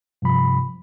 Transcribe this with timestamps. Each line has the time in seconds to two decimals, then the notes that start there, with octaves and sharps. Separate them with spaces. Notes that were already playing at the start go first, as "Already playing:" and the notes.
0.22 G2 C3 F3 B5